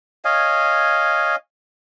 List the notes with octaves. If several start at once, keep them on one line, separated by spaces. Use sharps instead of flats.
C#5 D#5 F5 G#5